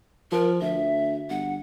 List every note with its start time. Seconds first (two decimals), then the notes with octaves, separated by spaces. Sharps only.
0.32 F3 A#4
0.61 D2 E5
1.30 G1 F#5